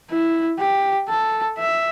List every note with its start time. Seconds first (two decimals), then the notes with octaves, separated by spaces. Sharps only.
0.10 E4
0.59 G4
1.09 A4
1.58 E5